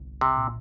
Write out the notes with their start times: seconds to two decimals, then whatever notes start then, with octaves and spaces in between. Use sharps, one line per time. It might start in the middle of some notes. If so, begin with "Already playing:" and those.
Already playing: G1 C2
0.21 C3
0.36 A#2